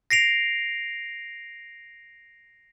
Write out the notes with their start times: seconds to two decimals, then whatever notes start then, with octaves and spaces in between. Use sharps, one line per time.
0.11 A#6 C7 D7 F7